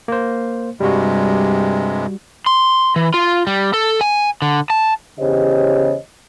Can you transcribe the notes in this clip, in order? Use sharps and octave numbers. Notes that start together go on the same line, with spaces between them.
A#3 C5
G2 C3 G3 G#3 F#4
C6
E3
F4
G3
A4
G#5
D3
A5
E2 C#3 G4 C5 C#5 D#5